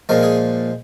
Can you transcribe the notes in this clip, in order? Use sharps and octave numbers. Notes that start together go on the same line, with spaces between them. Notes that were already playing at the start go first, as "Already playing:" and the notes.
A#2 F3 G#3 A#4
G#4